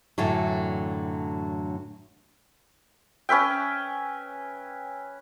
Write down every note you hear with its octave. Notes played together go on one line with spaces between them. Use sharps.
F#2 A2 D3 E3 F#3
C#4 B4 E5 G5